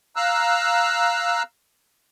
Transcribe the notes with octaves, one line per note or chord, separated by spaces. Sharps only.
F5 A#5 E6 F#6